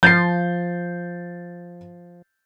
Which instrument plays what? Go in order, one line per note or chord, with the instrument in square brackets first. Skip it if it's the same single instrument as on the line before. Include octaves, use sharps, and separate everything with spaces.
[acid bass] F3 [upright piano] G6 A6 C7